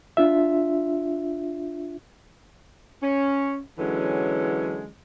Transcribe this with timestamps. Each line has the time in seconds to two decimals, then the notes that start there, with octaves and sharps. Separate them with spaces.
0.17 D4 F4 E5
3.02 C#4
3.78 D3 E3 F#3 G#3 C#4